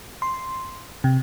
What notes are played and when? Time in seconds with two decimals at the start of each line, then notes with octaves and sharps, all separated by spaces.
0.22 C6
1.04 C3